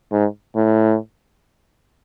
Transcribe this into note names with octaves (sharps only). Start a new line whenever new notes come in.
G#2
A2